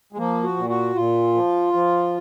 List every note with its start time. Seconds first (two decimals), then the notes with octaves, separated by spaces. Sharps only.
0.13 G#3
0.18 F3 A#3
0.44 F#4
0.57 A#2
0.70 F#4
0.95 A#2 F4
1.35 F3
1.73 F3